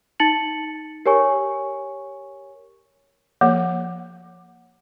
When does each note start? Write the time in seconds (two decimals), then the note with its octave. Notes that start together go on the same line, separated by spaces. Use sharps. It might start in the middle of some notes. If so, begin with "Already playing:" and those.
0.20 D#4 A5 A6 C#7 F#7
1.06 G4 A#4 C#5 G#5 C#6
3.41 F3 A#3